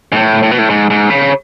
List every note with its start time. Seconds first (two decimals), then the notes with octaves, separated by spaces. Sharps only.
0.12 G#2
0.16 A2
0.43 A2
0.51 B2
0.59 A2
0.70 G#2
0.90 G#2
1.10 C#3